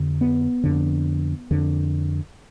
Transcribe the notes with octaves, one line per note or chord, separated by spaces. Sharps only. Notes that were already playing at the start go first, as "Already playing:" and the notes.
Already playing: F2 D3
B3
F2 D3
F2 D3